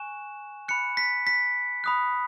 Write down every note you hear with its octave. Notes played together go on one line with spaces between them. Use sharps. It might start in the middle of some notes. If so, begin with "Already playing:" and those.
Already playing: G#5 C#6 F#6 E7
B5 F#6 C#7
B6
B6
B5 D#6 F#6